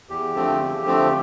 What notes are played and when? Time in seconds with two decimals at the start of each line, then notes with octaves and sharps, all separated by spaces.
0.09 E2 G4
0.34 D3 F3 A3 C4
0.58 E2
0.84 D3 F3 A3 C4